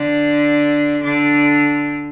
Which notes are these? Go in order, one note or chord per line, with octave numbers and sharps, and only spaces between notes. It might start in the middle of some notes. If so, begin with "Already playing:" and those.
Already playing: D3 D4
D3 D4